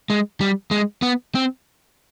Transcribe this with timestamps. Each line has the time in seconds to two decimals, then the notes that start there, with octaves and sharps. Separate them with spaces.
0.10 G#3
0.41 G3
0.71 G#3
1.02 B3
1.35 C4